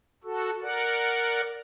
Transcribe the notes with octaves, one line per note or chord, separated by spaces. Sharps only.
F#4 A4
A#4 D5 F#5